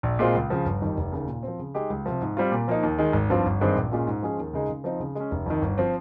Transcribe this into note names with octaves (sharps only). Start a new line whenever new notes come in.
A#1
A#2 G#3 C4 F4
C#2
C#3 F3
G1
F2 D#3 G3
F1
D#2 C#3
A#2
F3 C4
C#3
G#3 D#4 G4
C#2
C3 F3
G#2
G3 C4 F4
A#2
F3 A#3 D#4
D#2
D#3 G#3
G#1
G2 F3 C4 F4
G1
G2 D#3 G#3 C4
A#1
A#2 G#3 C#4 F4
G#2
F3 G#3 C#4 G#4
D#2
C#3 G#3 D#4 G#4
C#3
F3 C4 D#4
C#3
G#3 C#4
F1
F2 D#3
G1
F3 C4